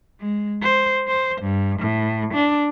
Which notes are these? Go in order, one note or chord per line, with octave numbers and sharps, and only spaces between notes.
G#3
C5
C5
G2
A2
D4